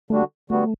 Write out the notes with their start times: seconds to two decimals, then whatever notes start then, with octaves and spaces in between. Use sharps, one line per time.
0.10 D3 G3 A3 D4 F#4
0.50 D3 G3 A3 B3 F#4